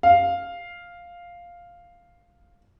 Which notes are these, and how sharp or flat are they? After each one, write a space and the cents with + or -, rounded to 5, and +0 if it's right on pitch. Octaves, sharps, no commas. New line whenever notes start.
F5 +0